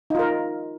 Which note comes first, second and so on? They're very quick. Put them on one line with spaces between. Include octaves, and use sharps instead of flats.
D#4 F4 A#4